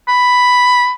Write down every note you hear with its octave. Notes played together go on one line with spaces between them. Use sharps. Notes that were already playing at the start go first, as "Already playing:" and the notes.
B5